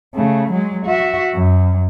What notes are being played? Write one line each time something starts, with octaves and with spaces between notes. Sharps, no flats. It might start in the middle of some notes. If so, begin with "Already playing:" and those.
C#3 A3
F#3 G#3
F#4 E5
F#2